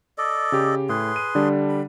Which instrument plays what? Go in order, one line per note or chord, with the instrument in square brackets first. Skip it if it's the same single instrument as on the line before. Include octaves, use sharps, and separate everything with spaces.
[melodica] A4 D5 D#5
[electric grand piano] C#3 G4
[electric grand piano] A2 [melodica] G#4 B4 C6
[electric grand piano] D#7
D3 G3 D4
[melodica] B5